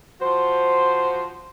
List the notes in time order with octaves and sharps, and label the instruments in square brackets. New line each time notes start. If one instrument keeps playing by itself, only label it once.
[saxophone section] F3 F#4 C5